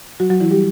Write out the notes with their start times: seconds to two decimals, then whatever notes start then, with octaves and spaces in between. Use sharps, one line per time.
0.20 F#3 F#4
0.30 F#3 F#4
0.41 E3 E4
0.51 G3 G4